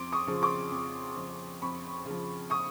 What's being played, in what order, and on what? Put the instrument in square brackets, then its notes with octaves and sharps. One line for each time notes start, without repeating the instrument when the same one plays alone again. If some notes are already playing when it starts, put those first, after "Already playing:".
Already playing: [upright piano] F2 C6 D6
C#6 D#6
C#3 F3
C6 D6
F2
C#3 F3
F2 B5 C#6
C#3
F3
C#6 D#6